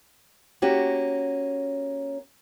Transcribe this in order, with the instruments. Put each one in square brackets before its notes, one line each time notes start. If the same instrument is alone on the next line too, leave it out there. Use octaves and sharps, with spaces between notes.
[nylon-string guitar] A#3 C#4 F#4 G4